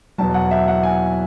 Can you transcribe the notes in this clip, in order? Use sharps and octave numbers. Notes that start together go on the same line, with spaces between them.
E2 B2 F#3 A5
F#5
E5
F#5
G#5